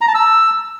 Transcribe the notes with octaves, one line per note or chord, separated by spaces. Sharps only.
A#5
A5
E6